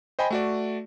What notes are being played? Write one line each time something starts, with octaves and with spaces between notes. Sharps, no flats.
C5 D#5 G5 G#5 B5
A3 F#4 D5